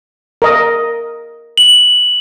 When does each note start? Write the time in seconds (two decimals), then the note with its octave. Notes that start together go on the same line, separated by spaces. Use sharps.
0.42 A#4 D#5
1.57 F#7